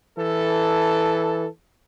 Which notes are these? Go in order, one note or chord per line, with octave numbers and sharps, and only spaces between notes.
E3 A4